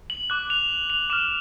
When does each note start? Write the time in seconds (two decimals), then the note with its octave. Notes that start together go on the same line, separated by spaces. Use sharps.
0.10 F#7
0.30 D6 F#6
0.50 F7
0.90 F7
1.10 D6 E7
1.13 F6